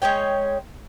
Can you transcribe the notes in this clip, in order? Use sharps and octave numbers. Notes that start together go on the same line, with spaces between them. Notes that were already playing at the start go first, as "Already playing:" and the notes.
G#3 C#4 C#5 G5